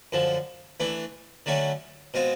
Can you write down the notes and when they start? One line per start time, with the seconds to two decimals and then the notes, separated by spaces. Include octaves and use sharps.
0.12 F#2 D3 F3
0.80 E3 A3 D4
1.46 D3 F#3 A3 C#4
2.14 B2 G#3 C4 F4